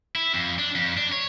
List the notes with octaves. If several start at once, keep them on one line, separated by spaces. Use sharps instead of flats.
E4
F2
D4
F2
D4
C#5